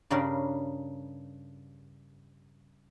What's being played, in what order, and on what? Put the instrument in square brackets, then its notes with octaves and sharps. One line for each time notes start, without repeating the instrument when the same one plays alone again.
[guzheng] G2 C#3 G3 D4 A#4 G5